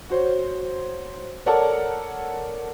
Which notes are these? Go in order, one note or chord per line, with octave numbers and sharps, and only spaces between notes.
F#4 C5 C#5
A4 A#4 C#5 D5 F#5 A5